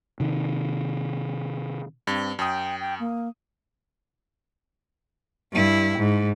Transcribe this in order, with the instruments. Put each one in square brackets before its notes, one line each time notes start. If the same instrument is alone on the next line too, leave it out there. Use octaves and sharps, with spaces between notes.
[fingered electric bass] C3 D#3
[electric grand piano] G2 [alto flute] C4
[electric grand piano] F#2 D#6 [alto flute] G5
[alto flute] G5
A#3
[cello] G2 E4
G#2